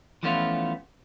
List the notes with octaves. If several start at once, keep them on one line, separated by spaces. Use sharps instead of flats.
E3 F3 A3 B3 C#4 F4